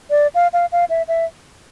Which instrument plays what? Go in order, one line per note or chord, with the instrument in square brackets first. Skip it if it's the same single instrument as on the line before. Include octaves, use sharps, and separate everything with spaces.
[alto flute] D5
F5
F5
F5
E5
E5